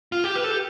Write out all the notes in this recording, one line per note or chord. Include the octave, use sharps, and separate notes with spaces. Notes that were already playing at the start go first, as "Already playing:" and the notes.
F4
G4
B4
A4
G4